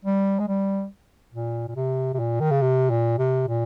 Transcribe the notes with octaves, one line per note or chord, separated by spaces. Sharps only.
G3
G#3
G3
A#2
A#2
C3
C3
A#2
D#3
C#3
C3
A#2
C3
A#2